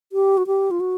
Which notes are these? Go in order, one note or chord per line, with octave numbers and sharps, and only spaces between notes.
G4
F#4
G4
F4
F#4